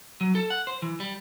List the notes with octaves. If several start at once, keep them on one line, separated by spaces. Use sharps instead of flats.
F#3
A4
F#5
C5
E3
G3